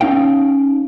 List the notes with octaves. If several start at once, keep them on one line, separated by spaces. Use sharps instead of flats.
C#4 D#4 F5 G5